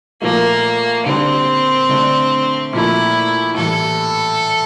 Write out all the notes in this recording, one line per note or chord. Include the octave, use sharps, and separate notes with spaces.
A#2 F3 A3 A#3
D3 G3 A#3 C4 D4
D3 A3 D4
A#2 F3 A3 E4
A2 E3 G3 A4